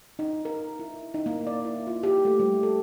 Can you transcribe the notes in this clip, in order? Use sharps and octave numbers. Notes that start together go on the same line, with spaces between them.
D#4
A#4
E4
D#4
A#3
D5
E4
F4
G4
A3
G3
A4